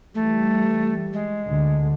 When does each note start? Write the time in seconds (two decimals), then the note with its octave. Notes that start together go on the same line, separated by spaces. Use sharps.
0.15 E3 G3 A3
1.13 G#3
1.45 D2 D3